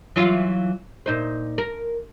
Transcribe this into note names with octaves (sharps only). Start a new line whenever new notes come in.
E3 F#3 F4
A#2 D#4 C5
A#4